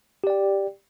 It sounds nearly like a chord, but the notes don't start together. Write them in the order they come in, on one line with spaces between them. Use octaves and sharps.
G4 D5 G5